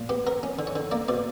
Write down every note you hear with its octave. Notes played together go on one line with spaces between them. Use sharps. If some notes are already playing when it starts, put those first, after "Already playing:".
Already playing: A#2
B3 G4
B3 A#4
C#4
D3
C#5
D3
A#3 D5
B2 D5